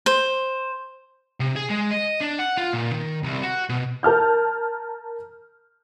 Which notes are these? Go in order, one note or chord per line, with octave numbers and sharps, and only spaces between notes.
C5
C3
G#4
G#3
D#5
D4
F#5
F4
A#2
D#3
C2
F#4
B2
A#4 A5 F6 G6